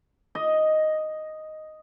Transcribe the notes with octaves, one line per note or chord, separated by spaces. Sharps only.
D#5